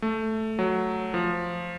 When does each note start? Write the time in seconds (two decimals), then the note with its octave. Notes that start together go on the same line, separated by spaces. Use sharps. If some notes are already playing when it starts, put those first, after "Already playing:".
0.02 A3
0.59 F#3
1.14 F3